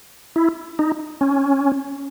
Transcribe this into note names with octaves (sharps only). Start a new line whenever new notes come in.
E4
D#4
C#4